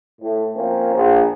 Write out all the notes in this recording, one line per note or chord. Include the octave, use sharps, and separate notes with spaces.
A2
F3 A#3 C4 C#4
A#1